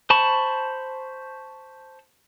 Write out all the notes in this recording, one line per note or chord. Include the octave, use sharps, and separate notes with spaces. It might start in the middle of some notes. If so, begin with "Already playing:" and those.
C5 A5 B5 C#6